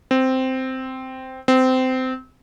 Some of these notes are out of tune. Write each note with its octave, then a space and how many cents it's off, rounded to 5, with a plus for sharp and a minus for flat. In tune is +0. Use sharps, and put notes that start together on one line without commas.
C4 -5
C4 -20